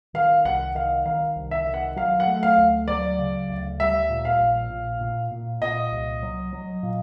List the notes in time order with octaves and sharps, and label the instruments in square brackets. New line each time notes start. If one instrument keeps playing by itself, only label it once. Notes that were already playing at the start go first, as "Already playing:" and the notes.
[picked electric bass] D#3 [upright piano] F5
[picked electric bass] C2 [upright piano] F#5
[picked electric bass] D#3 [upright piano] F5
[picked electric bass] D#3 [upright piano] F5
[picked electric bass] C2
[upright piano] E5
[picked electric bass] D#3
[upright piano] F#5
[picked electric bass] F#3 [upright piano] F5
[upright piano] F#5
[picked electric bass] A3
[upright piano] F5
[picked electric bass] D2
[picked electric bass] F#3 [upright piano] D5
[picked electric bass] C#3
D2
[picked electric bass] G3 [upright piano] E5
[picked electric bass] A#2
[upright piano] F5
[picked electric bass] A#1
A#2
A#2
A#2
[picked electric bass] A#2 [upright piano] D#5
[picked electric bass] C2
F#3
F#3
A#2